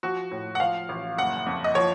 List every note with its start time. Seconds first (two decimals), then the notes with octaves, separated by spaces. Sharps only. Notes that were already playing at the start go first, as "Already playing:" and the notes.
0.03 F3 F#4
0.31 A2
0.55 F#5
0.60 F3 F5
0.89 A1
1.18 F#1 F#5
1.46 F2
1.64 D#5
1.75 F3 C#5